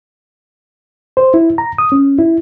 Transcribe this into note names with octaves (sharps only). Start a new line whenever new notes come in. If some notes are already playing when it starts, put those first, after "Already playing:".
C5
E4
A#5
D#6
C#4
E4